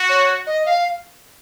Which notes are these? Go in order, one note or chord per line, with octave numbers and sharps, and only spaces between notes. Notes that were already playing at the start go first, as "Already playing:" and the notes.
Already playing: F#4
C#5
D#5
F5